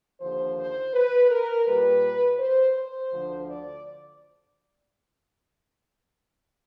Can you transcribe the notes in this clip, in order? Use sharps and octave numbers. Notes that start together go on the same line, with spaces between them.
D#2 D3 F3 C5
C5
B4
A#4
A#2 G3 B4
C5
C5
D2 D3 F3
D5